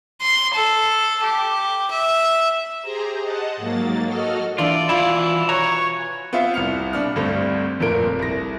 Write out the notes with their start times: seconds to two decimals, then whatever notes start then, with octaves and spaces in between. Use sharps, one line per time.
0.21 C6
0.54 A4
1.23 G4
1.91 E5
2.82 G4 G#4 C5 A#5
3.23 D#5 F#5 A5
3.57 G#2 F#3 A#3 A6
4.06 F#4 A4 D#5 F6
4.58 E3 D4 F4 D5
4.89 B2 E3 E4 F4 G#5 B5
5.49 B4 C#5 A#5
6.33 B3 C4 F4 E5 F5
6.54 C2 F6 C#7 F7
6.93 B2 D4 F6
7.15 D2 G2 G3 A3 C4
7.80 G1 F2 A#2 A3 A#4 D7
8.19 C2 A#6